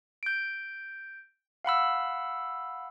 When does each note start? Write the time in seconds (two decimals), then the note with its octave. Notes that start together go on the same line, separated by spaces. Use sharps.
0.23 G6 D7
1.65 F5 F#5 B5 E6